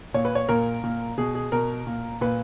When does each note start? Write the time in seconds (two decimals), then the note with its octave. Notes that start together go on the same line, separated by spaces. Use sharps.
0.14 A#2 C#5
0.25 B4
0.35 C#5
0.49 A#2 A#4
0.84 A#2
1.18 B2 G#4
1.35 G#4
1.52 B2 A#4
1.87 A#2
2.21 A#2 B4